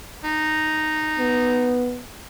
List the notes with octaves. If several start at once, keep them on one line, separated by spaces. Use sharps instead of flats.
D#4
B3